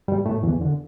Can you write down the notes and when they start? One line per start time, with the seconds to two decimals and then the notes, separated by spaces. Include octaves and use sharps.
0.08 G2 G3
0.26 A2 A3
0.43 E2 E3
0.61 D3